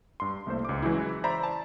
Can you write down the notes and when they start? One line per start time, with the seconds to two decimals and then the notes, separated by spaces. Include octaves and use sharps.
0.20 G2 C6
0.46 C2 A3 A#3 C5
0.65 C#2 D6
0.82 E3 F#3 G#3 C#4 E4
1.24 C5 D5 E5 A#5 B5
1.43 A5